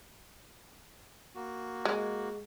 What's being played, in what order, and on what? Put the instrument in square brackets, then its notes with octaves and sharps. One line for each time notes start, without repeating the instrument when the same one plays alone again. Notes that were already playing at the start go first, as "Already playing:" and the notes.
[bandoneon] A#3 F#4
[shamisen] G#3